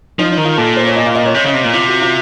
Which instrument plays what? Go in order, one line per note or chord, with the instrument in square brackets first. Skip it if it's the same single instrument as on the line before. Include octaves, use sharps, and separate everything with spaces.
[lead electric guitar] F3 [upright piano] D#4
[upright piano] D#4
[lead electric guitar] D#3
[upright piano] F4
[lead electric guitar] A#2 [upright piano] A4
[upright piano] C5
C#5
D#5
F5
D#5
C#5
[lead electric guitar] C3 [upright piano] D#5
[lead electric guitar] C#3 [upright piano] D#5
[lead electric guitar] C3
A#2
[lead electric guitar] C3 [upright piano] F4
[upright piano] F#4
F4